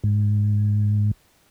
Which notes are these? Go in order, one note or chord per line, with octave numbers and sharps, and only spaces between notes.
G#2